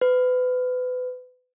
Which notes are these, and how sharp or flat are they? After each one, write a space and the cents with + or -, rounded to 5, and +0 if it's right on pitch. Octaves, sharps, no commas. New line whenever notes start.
B4 +30